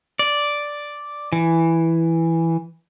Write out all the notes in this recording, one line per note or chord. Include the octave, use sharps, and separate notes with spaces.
D5
E3